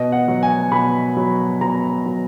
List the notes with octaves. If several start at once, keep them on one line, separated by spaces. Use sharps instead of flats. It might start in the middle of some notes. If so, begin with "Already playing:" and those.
Already playing: B2 D#5
F#5
F#3
G#5
B2 B5
F#3
B2 A#5
F#3